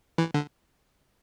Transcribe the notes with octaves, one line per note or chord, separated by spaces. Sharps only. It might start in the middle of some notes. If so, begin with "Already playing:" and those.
E3
D3